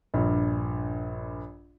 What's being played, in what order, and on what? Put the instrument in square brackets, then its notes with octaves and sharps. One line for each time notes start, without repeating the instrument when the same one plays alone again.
[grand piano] A#1 G2